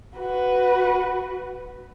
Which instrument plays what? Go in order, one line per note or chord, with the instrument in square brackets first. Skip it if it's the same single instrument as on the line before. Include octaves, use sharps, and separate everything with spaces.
[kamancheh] F#4 B4